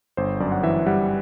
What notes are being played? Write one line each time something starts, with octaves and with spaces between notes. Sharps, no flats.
G1 C5
F#2 D5
F#5
E3 E5
G3 F#5